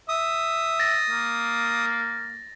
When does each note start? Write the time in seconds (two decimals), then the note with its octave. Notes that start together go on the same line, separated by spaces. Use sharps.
0.09 E5 D#6
0.80 A6 A#6
1.10 A#3